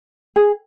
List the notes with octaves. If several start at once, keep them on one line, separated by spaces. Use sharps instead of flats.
G#4